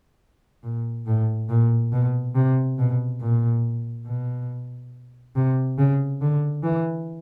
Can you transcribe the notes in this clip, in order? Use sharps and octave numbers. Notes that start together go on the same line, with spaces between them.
A#2
A2
A#2
B2
C3
B2
A#2
B2
C3
C#3
D3
E3